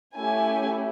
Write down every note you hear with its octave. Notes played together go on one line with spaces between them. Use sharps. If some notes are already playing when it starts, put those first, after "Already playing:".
A3 C#4 E4 G4 G#5